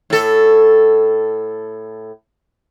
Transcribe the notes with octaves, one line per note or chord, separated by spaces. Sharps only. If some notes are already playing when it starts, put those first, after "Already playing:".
A2 A4